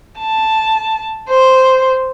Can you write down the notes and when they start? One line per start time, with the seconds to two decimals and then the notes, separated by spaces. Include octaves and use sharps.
0.20 A5
1.29 C5